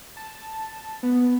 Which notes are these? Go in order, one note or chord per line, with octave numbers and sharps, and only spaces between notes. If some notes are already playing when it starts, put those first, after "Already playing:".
A5
B3